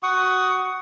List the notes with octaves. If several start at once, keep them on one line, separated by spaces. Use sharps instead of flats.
F#4 F#5 C#6 D#6